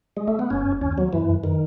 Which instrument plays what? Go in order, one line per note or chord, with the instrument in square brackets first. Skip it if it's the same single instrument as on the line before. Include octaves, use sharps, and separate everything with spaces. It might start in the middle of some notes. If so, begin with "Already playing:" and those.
[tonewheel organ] G#3
A3
B3
[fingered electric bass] F#1 [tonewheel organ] C#4
[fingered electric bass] F#1
[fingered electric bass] D#2 [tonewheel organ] C#4
[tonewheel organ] F#3 [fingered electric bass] B3
[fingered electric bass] F#2 [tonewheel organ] E3
[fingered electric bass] F#2
[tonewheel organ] D#3